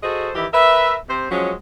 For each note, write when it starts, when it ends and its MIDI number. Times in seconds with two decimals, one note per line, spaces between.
0.03 0.29 66
0.03 0.29 68
0.03 0.29 69
0.03 0.29 72
0.03 0.29 75
0.35 0.46 51
0.35 0.46 52
0.35 0.46 64
0.35 0.46 67
0.53 0.94 70
0.53 0.94 71
0.53 0.94 76
1.09 1.26 48
1.09 1.26 72
1.31 1.53 53
1.31 1.53 54
1.31 1.53 56
1.31 1.53 61